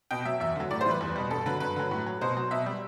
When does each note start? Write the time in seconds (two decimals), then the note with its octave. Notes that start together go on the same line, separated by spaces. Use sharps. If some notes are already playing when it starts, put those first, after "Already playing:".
0.11 B2 G5
0.25 F#3 E5
0.40 E2 E5
0.56 D3 F#3
0.70 A2 D5
0.81 C5
0.86 E3 G3 B4
1.01 E2
1.16 B2 G3
1.31 G2 A4
1.46 D3 F#3 B4
1.60 G2 B4
1.76 D3 F#3
1.91 A2
2.06 F#3
2.21 B2 C5
2.37 F#3
2.51 B2 E5
2.66 G3